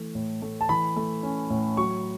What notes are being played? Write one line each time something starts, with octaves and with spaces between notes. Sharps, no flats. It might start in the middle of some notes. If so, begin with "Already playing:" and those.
Already playing: E3 A3
A2
A3
A5
E3 B5
A3
C#4
A2
F#3 C#6